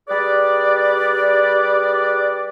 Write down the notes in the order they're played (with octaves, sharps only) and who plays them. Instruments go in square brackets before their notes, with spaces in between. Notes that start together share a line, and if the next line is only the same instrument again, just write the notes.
[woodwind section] G3 G#4 B4 D5